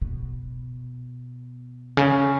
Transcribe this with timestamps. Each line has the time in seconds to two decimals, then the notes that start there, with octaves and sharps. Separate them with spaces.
0.01 B2
1.97 C#3